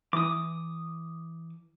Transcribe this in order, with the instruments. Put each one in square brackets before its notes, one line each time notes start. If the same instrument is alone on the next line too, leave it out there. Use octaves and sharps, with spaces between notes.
[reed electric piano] E3 [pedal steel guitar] D6 D#6